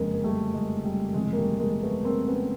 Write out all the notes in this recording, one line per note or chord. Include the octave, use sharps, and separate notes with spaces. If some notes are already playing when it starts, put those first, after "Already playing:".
Already playing: F#1 F2 D3 F#3 G#3 A#3 C#4
A#3
G3 A3
G#3
G3
G1 F2 C3 E3 G#3
A#3
G3 A3
G#3 A#3
A3 B3
A#3 C4
B3 C#4